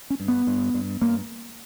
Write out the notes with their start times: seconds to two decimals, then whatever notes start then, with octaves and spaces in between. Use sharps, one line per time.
0.10 C#4
0.20 G2
0.28 B3
0.47 G2
0.74 G2
1.02 G2 A#3